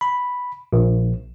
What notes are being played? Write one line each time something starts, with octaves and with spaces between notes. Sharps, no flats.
B5
A#1